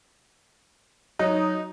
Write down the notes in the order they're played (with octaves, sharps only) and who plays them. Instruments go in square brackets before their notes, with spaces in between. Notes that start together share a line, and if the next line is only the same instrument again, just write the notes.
[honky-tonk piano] F#3 [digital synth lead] D#4